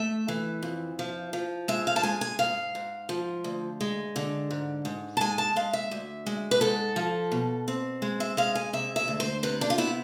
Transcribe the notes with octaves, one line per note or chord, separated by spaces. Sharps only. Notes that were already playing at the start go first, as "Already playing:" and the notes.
Already playing: A3 E5
E3
F2
F3
F3
G#3 E5
F5
A5
G#3 G#5
G#5
G#2 F5
G#2
F3
D2
G#3
D3
G#2
G#2
A5
G#3 G#5
A5
G#3 F5
E5
D2
G#3
B4
G#2 A4
F3
B2
C4
G#3
E5
G#3 F5
G#5
C3 E5
E5
D2
C5
C3 B4
D4
F4
B3 E4